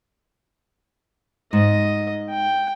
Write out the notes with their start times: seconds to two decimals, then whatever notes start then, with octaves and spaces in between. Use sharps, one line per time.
1.53 G#2 D#5
2.30 G5